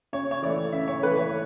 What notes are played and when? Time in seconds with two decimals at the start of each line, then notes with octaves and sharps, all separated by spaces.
0.13 C#3 C#5
0.31 C#5
0.42 E3 A3 E4 D5
0.72 C#3 E5
0.88 C#5
1.02 E3 A3 E4 B4
1.17 C#5